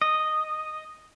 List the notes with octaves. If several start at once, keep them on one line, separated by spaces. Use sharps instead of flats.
D#5